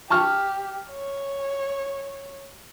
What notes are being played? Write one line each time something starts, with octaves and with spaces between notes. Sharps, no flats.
G4 A5 C#6 F6
C#5